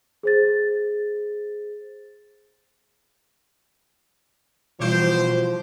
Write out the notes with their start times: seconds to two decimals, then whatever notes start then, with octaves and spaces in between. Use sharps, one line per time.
0.23 G#4 C5 A6
4.80 B2 E3 F3 G3 E4 G4 C5